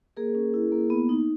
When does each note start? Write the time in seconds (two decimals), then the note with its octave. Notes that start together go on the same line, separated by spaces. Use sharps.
0.17 A#3 G#4 A#4
0.35 C#4
0.54 E4
0.72 A#3
0.90 B3
1.09 D#4